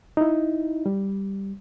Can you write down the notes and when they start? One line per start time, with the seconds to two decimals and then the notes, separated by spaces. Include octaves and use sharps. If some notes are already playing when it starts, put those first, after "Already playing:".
0.17 D#4 E4
0.86 G3